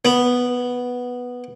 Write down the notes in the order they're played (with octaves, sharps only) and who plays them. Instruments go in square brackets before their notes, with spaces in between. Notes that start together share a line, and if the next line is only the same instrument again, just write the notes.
[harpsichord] B3